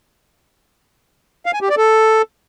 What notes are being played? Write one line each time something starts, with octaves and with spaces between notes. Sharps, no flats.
F5
G#5
G4
D5
A4